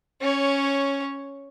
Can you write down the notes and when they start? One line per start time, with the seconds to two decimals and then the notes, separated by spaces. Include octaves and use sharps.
0.21 C#4 C#5